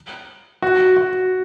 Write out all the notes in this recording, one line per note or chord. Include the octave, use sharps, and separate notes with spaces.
F#4
F#4